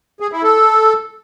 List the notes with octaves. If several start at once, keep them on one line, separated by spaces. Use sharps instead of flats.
G#4
E4
A4